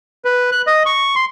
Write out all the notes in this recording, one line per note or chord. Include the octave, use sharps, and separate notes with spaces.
B4
F#6
D#5
C#6
C6